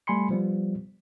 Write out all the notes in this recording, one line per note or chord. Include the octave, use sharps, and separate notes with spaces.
G3 A3 G#5 B5 C6 C#7
F3 G3 B3